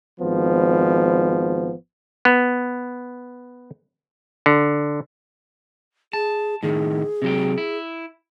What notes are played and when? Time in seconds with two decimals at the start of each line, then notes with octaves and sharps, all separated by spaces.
0.20 G#1 F3 B3
2.25 B3
4.46 D3
6.13 G#4 A5
6.63 A2 D#3 G#4
7.22 C3 F#3 G5
7.58 E4